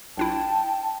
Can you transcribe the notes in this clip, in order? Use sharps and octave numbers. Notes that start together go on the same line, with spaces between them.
B1 D4 E4 G5 A5